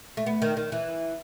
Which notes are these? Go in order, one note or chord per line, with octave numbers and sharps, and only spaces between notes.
A3
B3
D#3
D#3
E3